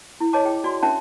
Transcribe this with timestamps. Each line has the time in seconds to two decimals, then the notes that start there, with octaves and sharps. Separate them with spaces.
0.20 E4
0.33 C#5 D#5 G#5 A5 D6
0.45 G#4 G5
0.64 F#4 D5 G#5 C6
0.83 C#4 D4 E5 G5 A5